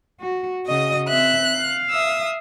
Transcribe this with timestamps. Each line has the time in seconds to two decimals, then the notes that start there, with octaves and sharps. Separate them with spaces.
0.21 F#4
0.65 C#3 F#4 D#5 D#6
1.09 C4 E5 F#6
1.57 F5
1.89 E5 D#6 E6